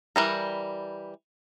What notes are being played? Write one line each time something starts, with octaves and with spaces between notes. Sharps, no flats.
E3 G3 A#4